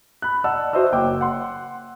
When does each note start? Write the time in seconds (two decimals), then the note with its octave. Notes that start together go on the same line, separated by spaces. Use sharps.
0.22 B5 F#6
0.44 D5 D#5 F#5 A5 E6
0.73 F#4 C5 D#5 E5 E6
0.92 F#1 G5 D6
1.21 F#5 C6